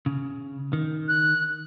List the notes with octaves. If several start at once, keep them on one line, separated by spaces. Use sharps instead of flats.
C#3
D#3
F#6